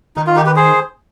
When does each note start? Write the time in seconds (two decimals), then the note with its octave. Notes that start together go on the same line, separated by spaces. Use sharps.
0.16 D#3 D#4
0.27 F4
0.36 D#4 G4
0.46 G4 B4
0.56 G#4 C5